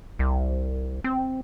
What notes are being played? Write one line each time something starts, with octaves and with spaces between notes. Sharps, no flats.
C2
C4